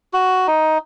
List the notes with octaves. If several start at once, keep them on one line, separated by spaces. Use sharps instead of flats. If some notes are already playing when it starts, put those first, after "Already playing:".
F#4
D#4